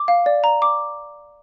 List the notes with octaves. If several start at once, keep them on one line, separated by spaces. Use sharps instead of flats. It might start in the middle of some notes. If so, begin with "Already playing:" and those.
Already playing: D6
F5
D5
A#5
D6